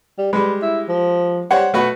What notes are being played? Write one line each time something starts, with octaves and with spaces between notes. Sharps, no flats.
G3
G3 G#3 B4
E4
F3
G3 C5 C#5 F#5
B2 A3 F#4 B4